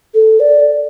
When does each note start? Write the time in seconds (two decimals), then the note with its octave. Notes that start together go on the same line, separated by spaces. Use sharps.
0.14 A4
0.40 D5